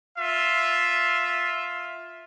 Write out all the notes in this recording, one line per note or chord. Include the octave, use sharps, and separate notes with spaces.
F4 E5